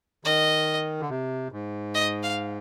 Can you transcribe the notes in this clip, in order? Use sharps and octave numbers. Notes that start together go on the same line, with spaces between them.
D#3 D#5
D3
C3
G#2
D#5
F5